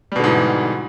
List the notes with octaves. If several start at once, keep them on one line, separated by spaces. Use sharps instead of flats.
G#2 B2 D3 E3 G3